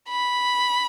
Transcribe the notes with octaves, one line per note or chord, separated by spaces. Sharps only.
B5